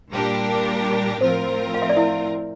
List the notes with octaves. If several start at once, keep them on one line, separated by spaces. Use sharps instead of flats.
A#2 G3 D4 G4 A#4
A2 F3 C4 F4 A#4 C5
F5
E5
D5
E4 E5